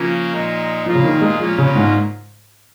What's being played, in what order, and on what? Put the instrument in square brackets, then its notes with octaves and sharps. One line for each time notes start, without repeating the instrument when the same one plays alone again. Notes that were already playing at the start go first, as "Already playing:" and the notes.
Already playing: [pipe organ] C#3 A#3 C#4 [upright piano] F3
[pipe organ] A#2 G#3 D#4
[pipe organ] A#2 A#3 F4 G#4 [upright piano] F3
[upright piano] C#3
D#3
G#3
[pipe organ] A#2 A#3 C#4 F4 [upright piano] F3
[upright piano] C#3
G#2